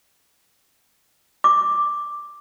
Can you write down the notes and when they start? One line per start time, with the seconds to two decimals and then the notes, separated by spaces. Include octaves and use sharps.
1.44 D6